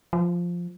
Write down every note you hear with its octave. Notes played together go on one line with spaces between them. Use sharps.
F3